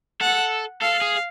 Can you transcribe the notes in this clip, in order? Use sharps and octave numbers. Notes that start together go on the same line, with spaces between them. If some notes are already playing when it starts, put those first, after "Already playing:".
A4 F#5
A4 F5
G#4